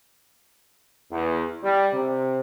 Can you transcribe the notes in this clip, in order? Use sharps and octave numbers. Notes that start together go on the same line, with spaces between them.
E2
G3
C3